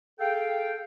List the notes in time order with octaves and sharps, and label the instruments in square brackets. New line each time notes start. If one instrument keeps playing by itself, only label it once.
[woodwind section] G#4 A4 F5 G5